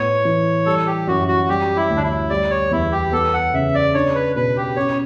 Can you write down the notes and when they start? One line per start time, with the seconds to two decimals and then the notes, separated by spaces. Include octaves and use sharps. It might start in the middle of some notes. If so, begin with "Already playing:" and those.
Already playing: A2 B3 C#5
0.25 E3
0.66 G3 A4
0.86 G4
1.07 F#2 F#4
1.28 F#4
1.49 G3 G4
1.76 E4
1.90 D2
1.97 D4
2.03 E4
2.30 G3 D5
2.50 C#5
2.71 E2 E4
2.92 G4
3.12 B3 A4
3.33 F#5
3.53 C#3 E5
3.75 D5
3.94 D4 C#5
4.15 B4
4.36 B2 B4
4.57 G4
4.76 C#4 C#5